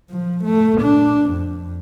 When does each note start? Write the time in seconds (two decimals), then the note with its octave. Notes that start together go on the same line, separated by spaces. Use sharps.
0.11 F3
0.45 A3
0.81 D4
1.31 F2